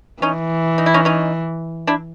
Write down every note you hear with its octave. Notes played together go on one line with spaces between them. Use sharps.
E3 C#4 D#4
D#4
E4
C#4 D#4
C#4 D#4
D4 E4